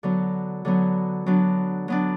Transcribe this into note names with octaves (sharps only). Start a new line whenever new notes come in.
D3 F#3 B3
D3 F#3 B3
F#3 B3 D4
F#3 B3 D4